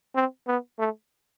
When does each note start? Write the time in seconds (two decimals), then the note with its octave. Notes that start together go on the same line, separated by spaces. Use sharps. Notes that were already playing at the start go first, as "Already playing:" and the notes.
0.16 C4
0.48 B3
0.79 A3